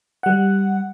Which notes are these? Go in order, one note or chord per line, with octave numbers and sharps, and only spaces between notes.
G3 F#5